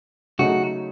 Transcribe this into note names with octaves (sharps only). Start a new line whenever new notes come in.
C#3 F#3 A3 D#4 F#4 G#4